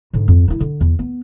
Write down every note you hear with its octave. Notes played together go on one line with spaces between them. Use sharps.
G#2 D3
F2
D#3 E4
D3
E2
B3